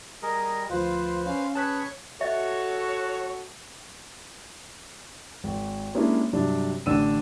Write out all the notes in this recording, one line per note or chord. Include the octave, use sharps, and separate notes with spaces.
G3 G#4 A#4 D#5
D2 F3 F4 B4 C5 F5
C#4 F5
G#4 B4 C#5 A5 F#6 B6
F#4 A4 C#5 D#5 E5
G#1
G#3 A#3 C#4 D4 E4 G4
G2 C3 F#3 D4
A1 D3 D4 E6 D#7